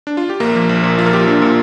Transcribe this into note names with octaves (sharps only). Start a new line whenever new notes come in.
D4
F4
G4
A#1 A#3 A#4
F3
A#1
A#2
F3 F4
A#4
F3 G4
F4
F3 D4
A#2